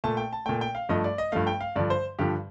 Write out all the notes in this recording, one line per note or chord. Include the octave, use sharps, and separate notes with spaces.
A#2 A3 A5
G5
A5
A#2 A3 G5
G5
F5
G2 F3 A3 D#5
D5
D#5
G2 F3 A3 F5
G5
F5
G2 D3 F3 D5
C5
G2 D3 F3 G4